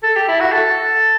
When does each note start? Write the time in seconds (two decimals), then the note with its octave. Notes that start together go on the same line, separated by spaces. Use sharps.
0.03 A4
0.16 G4
0.28 E4
0.40 F#4
0.52 A4